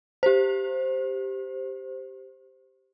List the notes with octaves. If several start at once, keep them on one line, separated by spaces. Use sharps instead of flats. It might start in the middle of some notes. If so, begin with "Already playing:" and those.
G4 C5